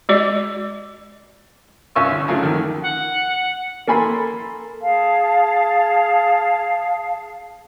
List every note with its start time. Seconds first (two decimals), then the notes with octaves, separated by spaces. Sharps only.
0.09 G#3 F#4 D5 D#5
1.95 C2 C#4 F4 C#6 E6
2.11 D3
2.28 C#3 F3 F#3 A3
2.43 D#2 D#3
2.82 F#5
3.88 A#3 A4 G#5 B5 C6
4.81 G#4 F5 A5